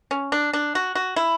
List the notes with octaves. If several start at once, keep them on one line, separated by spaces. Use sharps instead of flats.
C#4
D4
D4
F#4
F#4
E4